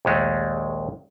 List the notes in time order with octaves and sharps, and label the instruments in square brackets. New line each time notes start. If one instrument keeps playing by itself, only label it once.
[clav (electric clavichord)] A#1 D#2 G#3 A3